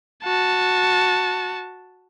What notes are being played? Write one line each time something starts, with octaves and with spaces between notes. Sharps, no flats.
F#4 A5